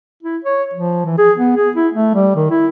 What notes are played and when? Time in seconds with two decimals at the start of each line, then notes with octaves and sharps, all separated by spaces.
0.23 E4
0.44 C#5
0.74 F3
1.05 E3
1.18 G#4
1.38 B3
1.56 G#4
1.76 E4
1.93 A3
2.15 G3
2.36 D#3
2.51 E4